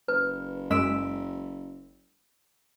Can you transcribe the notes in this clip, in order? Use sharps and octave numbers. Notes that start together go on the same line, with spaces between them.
F#1 B4
F#2 G#3 E6 B6 D7